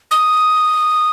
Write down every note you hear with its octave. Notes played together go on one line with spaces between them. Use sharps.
D#6